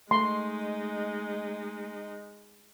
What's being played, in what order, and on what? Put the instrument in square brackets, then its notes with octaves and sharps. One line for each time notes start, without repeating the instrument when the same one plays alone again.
[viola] G#3 D#4 [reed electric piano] A3 [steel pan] C6